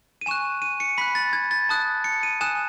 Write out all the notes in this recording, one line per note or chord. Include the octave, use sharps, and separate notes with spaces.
D#7
G#5 C#6 F#6 E7
D#7
C#7
B5 F#6 B6
A6
G#6
A6
A5 D#6 F#6
C#7
D#7
G#5 D#6 F#6 E7